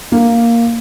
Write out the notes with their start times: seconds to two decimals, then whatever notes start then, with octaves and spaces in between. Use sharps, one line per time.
0.12 A#3